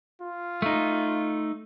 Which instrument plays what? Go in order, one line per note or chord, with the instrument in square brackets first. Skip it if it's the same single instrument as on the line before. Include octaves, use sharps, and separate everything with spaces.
[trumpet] F4
[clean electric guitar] A3 D#4